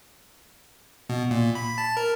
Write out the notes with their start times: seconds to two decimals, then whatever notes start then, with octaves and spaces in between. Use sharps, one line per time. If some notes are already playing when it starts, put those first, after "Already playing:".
1.09 B2
1.31 A#2
1.55 B5
1.78 A5
1.97 A#4